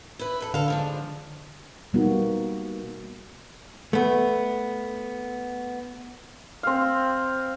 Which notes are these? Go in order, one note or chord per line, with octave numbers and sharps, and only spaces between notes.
E4 B4
A4 B4
D3 A4 F5
G#2 F3 D4
B2 G3 A#3 B3 D#4 F#4
A3 B3
C4 F5